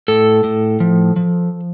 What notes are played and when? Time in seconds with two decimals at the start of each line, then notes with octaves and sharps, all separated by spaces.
0.08 A2 A4
0.44 A2
0.80 F3
1.16 F3